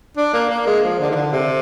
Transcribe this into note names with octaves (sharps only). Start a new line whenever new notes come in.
D4
A#3
A#3
G#3
F3
D3
D#3
D3
C3